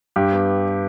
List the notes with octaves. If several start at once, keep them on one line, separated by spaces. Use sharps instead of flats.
G2 G4
B3